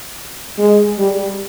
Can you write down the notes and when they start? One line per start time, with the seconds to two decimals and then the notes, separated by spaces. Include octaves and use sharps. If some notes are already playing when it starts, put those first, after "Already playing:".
0.59 G#3
0.99 G3